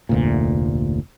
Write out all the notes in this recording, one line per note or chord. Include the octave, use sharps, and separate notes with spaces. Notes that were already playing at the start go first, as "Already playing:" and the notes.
F1 D2 A#2